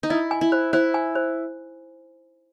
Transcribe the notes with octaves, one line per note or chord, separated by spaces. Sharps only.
D#4
E4 D#5
G#5
E4
C5
E4 C5
G#5
C5